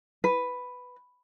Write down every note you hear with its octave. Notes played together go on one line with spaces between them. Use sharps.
B4